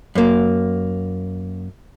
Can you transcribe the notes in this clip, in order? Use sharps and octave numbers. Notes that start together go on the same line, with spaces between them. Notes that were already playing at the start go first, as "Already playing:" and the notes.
F#2 A#3